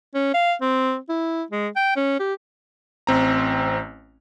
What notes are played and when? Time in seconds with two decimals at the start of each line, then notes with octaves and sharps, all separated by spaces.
0.15 C#4
0.34 F5
0.62 C4
1.09 E4
1.51 G#3
1.76 G5
1.96 C#4
2.20 G4
3.07 A1 C4 A#5